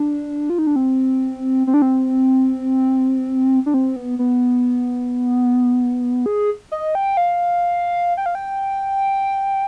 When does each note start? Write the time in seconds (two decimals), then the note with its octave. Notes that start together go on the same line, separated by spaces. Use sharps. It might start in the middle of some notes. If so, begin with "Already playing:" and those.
Already playing: D4
0.50 F4
0.59 D#4
0.67 D4
0.76 C4
1.67 C4
1.74 D4
1.82 C4
3.66 D4
3.74 C4
3.96 B3
4.19 B3
6.26 G#4
6.72 D#5
6.95 G5
7.17 F5
8.17 G5
8.26 F5
8.35 G5